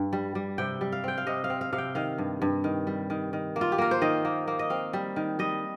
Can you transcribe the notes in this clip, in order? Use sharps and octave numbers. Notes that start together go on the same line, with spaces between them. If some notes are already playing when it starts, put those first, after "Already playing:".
Already playing: G2
G3
G3
C3 G5
G3
F5
C4 G5
F5
C3 D#5
F5
C4
F5
C3 F5
G5
D#3 F5
G2
G2
D#3
G3
D#3
D#3
A#3
F4
G4
A#3 A#4
C5
D#3 D#5
A#3
A#3
D#5
C4 F5
G3
D#3
G3 D#5